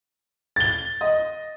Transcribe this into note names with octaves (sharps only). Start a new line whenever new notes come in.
A6 G7
D#5